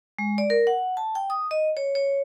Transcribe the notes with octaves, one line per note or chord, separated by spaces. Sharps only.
G#3
D5
A#4
F#5
A5
G5
D#6
D#5
C#5
C#5